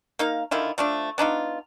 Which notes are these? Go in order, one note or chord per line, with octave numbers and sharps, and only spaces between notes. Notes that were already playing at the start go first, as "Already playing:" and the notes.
A#3 D#4 F5
D3 D#3 E4 F4
F3 A3 D4
B3 D4 D#4 F4